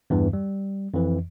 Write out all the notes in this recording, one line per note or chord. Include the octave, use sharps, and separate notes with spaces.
E2 G2 E3
G3
F2 E3